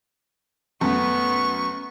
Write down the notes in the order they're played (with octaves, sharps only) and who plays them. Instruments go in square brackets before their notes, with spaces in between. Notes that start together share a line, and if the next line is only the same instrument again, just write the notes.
[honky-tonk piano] F#2 A3 [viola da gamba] B3 [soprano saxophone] C#6